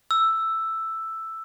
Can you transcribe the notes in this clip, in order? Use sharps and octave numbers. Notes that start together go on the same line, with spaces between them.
E6